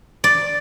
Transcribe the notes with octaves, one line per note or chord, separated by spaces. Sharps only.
D5